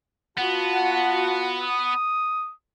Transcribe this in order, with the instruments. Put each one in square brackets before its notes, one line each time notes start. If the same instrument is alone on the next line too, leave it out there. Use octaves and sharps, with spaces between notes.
[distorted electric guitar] B3 [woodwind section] F4 F#4 F#5 [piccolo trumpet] A5
[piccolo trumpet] D#6